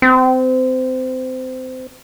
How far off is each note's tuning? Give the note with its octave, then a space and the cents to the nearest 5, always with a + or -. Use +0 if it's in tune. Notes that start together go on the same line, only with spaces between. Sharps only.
C4 -25